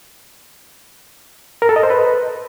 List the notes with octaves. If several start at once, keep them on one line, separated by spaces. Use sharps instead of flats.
A#4
A4
D#5
C5
B4